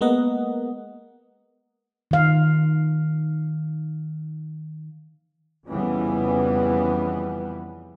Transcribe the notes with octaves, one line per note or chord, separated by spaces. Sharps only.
G#3 A#3 B3 A#4 D#5 F#5
D#3 F5
F2 C#3 E3 G3 B3